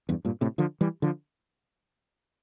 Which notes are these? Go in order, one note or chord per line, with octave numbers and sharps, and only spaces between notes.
E2 G2
G2 A#2
A2 C3
D3 F3
E3 G3
D3 F3